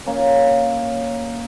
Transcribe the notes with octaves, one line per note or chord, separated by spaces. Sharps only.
A#3 C#4